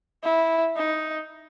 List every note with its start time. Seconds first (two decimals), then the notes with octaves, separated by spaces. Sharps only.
0.23 E4
0.76 D#4